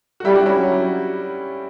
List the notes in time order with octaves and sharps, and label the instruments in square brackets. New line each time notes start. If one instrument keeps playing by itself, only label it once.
[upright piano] F#4
[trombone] G3 [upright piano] E4 G4
[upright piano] D4 F#4
C#4 E4
[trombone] F#3
[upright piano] G3